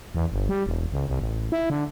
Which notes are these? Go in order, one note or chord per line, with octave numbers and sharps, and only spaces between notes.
E2
G1
G3
E1
C#2
C2
A1
E4
D3